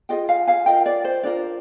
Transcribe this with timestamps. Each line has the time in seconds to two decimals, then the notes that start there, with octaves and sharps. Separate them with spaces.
0.09 F4 G#4 D#5 G5
0.29 F5 G#5
0.47 F5 G#5
0.66 F4 A#4 D#5 G5
0.86 D5
1.05 C5
1.23 D4 F4 A#4 D5